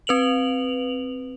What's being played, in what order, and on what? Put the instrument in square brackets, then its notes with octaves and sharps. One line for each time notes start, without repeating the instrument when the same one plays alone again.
[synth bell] C4 B4 F7 F#7